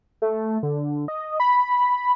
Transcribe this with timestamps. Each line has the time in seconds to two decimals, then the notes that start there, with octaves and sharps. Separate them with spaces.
0.22 A3
0.63 D3
1.08 D#5
1.40 B5